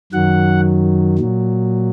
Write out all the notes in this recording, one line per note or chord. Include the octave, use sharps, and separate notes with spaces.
F#2 D#3 F#3 F#5
A#2 F#3